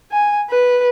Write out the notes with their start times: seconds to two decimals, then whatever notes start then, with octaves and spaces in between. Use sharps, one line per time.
0.12 G#5
0.50 B4